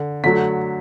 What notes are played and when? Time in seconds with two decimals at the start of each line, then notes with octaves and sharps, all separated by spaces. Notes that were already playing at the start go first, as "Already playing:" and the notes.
Already playing: D3
0.24 D3 F#3 A3 B6